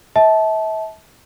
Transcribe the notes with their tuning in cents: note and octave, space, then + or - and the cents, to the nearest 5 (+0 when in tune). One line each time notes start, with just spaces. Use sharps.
E5 -40 A5 -20